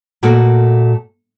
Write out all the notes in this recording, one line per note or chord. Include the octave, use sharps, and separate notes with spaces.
A#2 A3 A#3 F#4